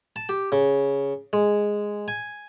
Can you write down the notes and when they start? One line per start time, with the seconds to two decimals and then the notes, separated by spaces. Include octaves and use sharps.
0.16 A5
0.29 G4
0.52 C#3
1.33 G#3
2.08 G#5